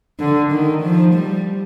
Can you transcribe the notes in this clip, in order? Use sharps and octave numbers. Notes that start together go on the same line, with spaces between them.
D3
D#3
F3
G3